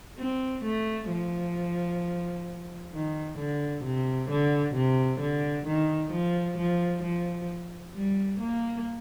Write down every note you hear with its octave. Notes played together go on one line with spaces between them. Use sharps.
C4
A3
F3
D#3
D3
C3
D3
C3
D3
D#3
F3
F3
F3
G3
A#3